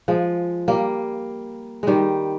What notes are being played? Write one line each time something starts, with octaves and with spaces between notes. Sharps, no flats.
F3 G#3
G3 A#3
D#3 G3 G#3